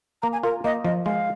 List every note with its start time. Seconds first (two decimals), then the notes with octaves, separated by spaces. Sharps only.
0.22 A#3 A#5
0.33 G#5
0.43 F4 A#4
0.64 A#3 D#5
0.85 F3 D#5
1.05 G#3 F5